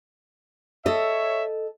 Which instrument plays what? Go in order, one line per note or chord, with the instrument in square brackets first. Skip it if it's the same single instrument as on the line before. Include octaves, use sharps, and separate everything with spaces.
[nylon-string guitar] A4 D#5 [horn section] C#5 E5